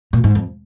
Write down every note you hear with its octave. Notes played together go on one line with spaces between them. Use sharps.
A#2
G#2
F2